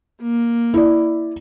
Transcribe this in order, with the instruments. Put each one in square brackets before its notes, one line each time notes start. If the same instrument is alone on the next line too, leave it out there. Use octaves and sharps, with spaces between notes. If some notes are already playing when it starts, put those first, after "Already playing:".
[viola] A#3
[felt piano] E4 D5